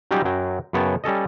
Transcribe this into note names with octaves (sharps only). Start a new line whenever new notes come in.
F#3 G3 C#4 D#4 F4 G4
F#2 F#3 G5
F#2 C#3 B3 C#5 G5 A5
G3 C#4 A4 D#5